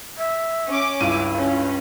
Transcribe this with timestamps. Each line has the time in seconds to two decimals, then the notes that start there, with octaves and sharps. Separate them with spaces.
0.18 E5
0.69 C#4 D6
1.01 C#2 G2 E4 D#7
1.37 C#4